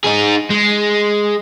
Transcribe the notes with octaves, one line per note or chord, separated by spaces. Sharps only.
D#4 G#4
G#3